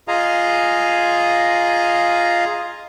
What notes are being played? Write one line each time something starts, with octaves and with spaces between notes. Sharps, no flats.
F4 G#4 D#5 F5 G#5 A#5